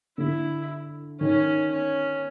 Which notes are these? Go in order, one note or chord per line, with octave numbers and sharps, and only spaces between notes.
D3 E4
D#3 C#4
C#4